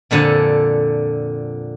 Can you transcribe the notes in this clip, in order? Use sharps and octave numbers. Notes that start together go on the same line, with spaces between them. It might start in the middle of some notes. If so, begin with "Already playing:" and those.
F2 A#2 D3 A4 G#5